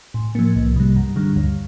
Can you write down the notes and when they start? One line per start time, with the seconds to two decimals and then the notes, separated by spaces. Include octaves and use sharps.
0.14 A2
0.35 F3 A#3
0.55 C2
0.76 C3 G3
0.96 G2
1.16 D3 G3
1.36 D2